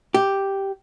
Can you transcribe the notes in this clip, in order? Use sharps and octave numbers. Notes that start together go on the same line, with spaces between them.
G4